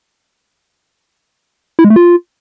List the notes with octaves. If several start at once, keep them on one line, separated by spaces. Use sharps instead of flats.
E4
G#3
A3
F4